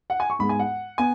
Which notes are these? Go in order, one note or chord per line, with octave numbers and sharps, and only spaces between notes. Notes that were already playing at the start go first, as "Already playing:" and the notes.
F#5
G#5
C#6
G#2 G#3 B3 B5
G#5
F#5
B3 G#5